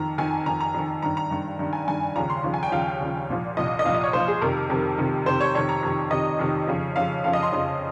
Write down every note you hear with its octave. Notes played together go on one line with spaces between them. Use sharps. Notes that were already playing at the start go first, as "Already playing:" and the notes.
Already playing: F2 D#3 A#5
F2 D#3 G#5
F2 D#3 A#5
A#5
F2 D#3
G2 D#3 A#5
A#5
G2 D#3
G2 D#3
G#5
G2 D#3 G#5
D#2 C#3 F3 A#5
C6
D#2 C#3 F3
G#5
G5
D#2 C#3 F3 F5
D#2 C#3 F3
C2 A#2 F3
C2 A#2 F3 D#5
D#5
C2 A#2 F3 F5
D#5
C#5
C2 A#2 F3 C5
G#4
F2 C3 D#3 A#4
F2 C3 D#3
F2 C3 D#3
F2 C3 D#3 C5
C#5
F2 C3 D#3 C#5
A#5
F2 C3 D#3
F2 C3 D#3 D#5
F2 C3 D#3
F2 C#3 F3
F2 C#3 F3 F5
F2 C#3 F3 F5
D#5
C6
F2 C#3 F3